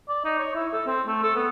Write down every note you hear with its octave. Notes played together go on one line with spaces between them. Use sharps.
D5
D#4
C#5
E4
A4
C4
A3
A4
B3